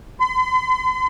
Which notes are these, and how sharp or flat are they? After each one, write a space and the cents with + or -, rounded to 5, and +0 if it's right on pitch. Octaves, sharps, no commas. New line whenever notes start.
C6 -45